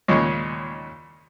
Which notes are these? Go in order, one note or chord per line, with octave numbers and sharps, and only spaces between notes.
D#2 A#2 C#3 G#3 C#4